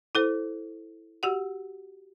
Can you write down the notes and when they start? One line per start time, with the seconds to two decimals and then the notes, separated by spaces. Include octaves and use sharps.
0.15 E4 A4 C5
1.23 F#4 G4 F#5